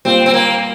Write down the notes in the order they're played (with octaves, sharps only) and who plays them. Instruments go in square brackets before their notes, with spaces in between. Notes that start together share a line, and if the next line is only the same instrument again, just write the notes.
[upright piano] A#2 G3 A#3 F4 [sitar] C4
[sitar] C4
A#3